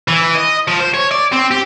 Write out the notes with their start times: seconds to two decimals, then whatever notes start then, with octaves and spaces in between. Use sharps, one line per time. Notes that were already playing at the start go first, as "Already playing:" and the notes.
0.08 E3
0.35 D#5
0.68 F3
0.80 C5
0.94 C#5
1.11 D5
1.32 C4
1.51 G4